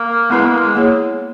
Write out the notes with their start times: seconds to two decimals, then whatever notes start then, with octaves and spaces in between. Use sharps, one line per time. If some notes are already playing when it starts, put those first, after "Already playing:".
Already playing: A#3
0.30 G#3 B3 E4 B4
0.46 A#3
0.60 G#3
0.75 A#3 E4 G#4 C#5